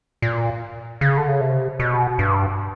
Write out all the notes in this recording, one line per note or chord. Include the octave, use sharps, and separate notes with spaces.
A#2
C#3
D3
C#3
C3
B2
G2